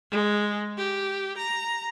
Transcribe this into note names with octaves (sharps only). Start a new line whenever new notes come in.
G#3
G4
A#5